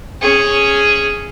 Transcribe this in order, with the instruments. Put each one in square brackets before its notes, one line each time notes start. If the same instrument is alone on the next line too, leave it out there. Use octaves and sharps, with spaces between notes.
[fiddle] C#4 G#4